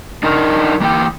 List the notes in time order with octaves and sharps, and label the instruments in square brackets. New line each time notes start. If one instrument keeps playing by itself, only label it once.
[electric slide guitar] D4 D#4 A#4 D#5
E3 A#3 D5 G5